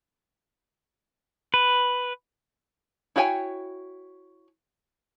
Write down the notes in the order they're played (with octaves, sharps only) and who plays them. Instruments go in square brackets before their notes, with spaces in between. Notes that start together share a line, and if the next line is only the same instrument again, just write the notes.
[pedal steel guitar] B4
[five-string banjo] E4 F#4 C#5 G5 G#5